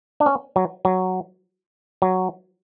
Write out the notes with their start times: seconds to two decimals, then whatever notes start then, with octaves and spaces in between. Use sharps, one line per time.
0.20 D4
0.26 C#4
0.56 F#3
0.85 F#3
2.02 F#3